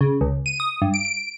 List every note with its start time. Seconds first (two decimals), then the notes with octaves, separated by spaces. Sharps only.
0.01 C#3
0.21 C#2
0.46 D#7
0.60 D#6
0.82 G2
0.94 D7
1.05 D7